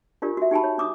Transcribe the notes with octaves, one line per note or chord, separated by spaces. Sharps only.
D4 F4 G4 A#4 D5
F#4 E5
D#4 G4 G#5 A5 B5
C#5
D4 D6 D#6